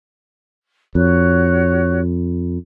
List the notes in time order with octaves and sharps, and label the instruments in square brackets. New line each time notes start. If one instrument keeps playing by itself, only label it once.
[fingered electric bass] F2 [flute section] F#4 C#5 F#6